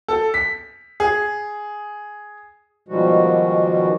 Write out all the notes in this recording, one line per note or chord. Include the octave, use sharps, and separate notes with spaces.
A4
B6
G#4
B2 D#3 F3 G3 G#3 F#4